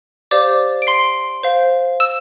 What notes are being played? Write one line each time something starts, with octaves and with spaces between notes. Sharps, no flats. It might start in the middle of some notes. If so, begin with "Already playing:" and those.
G4 C5 D5 F5 D6
D7
C6 C7
C5 F5
E6 E7